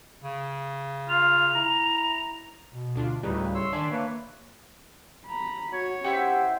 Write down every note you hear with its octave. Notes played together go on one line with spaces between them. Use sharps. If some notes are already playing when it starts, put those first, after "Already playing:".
C#3
F4 F7
E4 A#5
B2
D2 D4 F4
D2 A2 C#3 G3 D#4 B4
C#5 C6 E6
D#3 D4 D5 E5 G#5 A5 C6
A#3 B4 C#5
A#5 B5
F#4 C#5
C#4 E4 G4 C5 E5 F#5